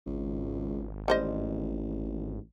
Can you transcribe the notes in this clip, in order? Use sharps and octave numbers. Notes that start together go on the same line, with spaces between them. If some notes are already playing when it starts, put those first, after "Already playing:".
G#1 C#2
A1 G3 C5 D#5